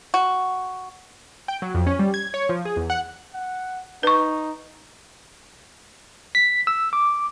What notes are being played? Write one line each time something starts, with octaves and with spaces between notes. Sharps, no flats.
F#4
G5
F#3
F2
C#4
G3
G#6
C#5
F3
G#4
E2
F#5
F#5
D#4 B4 C#6
B6
E6
D6